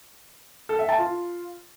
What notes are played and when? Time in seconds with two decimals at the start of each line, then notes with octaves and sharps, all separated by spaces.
0.69 A4
0.79 E5
0.89 A5
0.98 F4